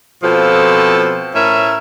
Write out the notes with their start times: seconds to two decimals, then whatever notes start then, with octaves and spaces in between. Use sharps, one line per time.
0.23 B2 F3 C4 F4 A4
1.34 A2 C#4 A#4 E5